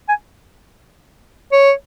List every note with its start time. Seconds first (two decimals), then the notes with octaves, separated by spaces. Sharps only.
0.09 G#5
1.52 C#5